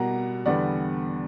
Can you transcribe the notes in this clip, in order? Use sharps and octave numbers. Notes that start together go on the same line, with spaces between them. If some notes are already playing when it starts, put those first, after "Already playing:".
Already playing: B2 G3 A#3 F#5 A#5
E2 D3 G3 B3 D5 F#5